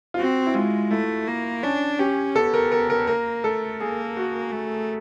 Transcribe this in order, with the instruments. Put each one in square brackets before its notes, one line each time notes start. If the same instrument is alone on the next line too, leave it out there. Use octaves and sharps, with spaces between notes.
[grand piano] F4
[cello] C4 [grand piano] F#4
[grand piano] E4
[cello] G#3 [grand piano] F4
[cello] A3 [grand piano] E4
[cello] A#3
[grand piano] C#4 [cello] D4
[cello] C#4 [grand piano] G4
[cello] B3 [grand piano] A4
[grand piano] A#4
A#4
A#4
[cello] A#3 [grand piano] A#4
[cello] A3 [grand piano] A4
[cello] A#3 [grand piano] G#4
[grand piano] F#4
[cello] A3